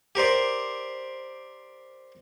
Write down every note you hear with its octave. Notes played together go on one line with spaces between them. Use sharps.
G4 A#4 C5 D5